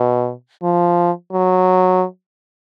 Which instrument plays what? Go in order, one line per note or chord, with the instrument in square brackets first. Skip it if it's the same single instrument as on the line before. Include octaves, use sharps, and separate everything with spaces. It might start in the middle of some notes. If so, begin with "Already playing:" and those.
Already playing: [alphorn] B2
F3
F#3